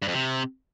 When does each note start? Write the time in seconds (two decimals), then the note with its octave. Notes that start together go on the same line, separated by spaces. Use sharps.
0.02 G2
0.08 F2
0.14 C3